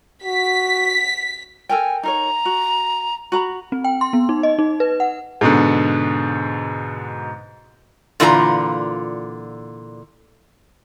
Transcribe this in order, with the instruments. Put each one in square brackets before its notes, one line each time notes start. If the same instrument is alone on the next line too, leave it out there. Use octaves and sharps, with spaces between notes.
[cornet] F#4 [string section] B6
[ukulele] A4 A#4 G5 [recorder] G#5
[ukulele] D#4 A#4 C#5 [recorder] A#5
[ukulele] F#4
F#4 A#5 B5
[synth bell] C4
G5
C6
B3
D#4
D#5
D#4
B4
F#5
[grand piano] G#2 B2 D3
[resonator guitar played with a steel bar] A#2 D3 E3 F4 A#4 A#5